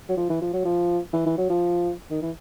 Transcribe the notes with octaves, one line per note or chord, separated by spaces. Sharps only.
F#3
F3
E3
F3
F#3
F3
E3
E3
F#3
F3
D#3
E3